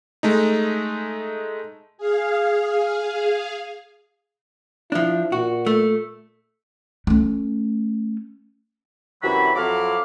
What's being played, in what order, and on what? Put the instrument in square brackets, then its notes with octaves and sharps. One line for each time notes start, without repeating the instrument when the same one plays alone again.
[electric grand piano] G#3 A3 D#4
[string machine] G#4 F5
[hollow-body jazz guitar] F3 D4 [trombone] E4
[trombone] A#2 [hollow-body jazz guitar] F#4
[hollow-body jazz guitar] A3
[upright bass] A3 C#4
[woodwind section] F#2 C3 E3 F#3 F#4 B5
F2 F3 F#3 E4 F5 D6